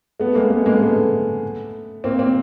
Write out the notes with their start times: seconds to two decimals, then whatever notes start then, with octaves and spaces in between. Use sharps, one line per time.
0.20 A3 B3
0.35 G#3 A#3
0.50 A3 B3
0.66 G#3 A#3
0.81 A3 B3
2.04 A#3 C4
2.19 A#3 C4